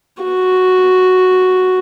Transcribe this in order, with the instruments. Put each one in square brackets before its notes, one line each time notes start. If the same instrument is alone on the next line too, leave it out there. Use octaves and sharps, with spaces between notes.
[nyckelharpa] F#4